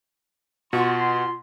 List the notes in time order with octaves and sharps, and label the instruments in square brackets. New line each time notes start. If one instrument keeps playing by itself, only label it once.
[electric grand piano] B2 [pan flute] F4 [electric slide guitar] F#4 [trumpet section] C6